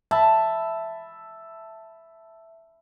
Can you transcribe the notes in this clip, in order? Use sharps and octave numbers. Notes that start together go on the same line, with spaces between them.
E5 A5 B5